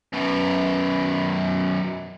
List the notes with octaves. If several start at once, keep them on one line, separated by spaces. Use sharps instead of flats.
F#2 B2